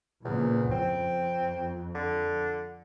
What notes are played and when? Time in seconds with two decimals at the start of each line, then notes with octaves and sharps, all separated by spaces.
0.25 E2 A#2 C#3 F3
0.71 F2 C4
1.94 D3